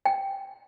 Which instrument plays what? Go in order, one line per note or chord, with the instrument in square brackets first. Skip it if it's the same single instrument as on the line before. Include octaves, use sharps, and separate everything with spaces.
[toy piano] G5